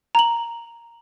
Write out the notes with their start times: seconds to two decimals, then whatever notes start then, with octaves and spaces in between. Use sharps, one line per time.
0.15 A#5 F#7